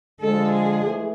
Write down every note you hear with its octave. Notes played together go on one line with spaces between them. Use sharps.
D3 F3 G#3 A4
G#4
E3 A3